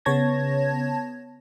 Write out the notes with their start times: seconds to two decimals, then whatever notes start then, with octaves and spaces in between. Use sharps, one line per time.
0.05 C#3 B3 C#5 A5 G#6 A#6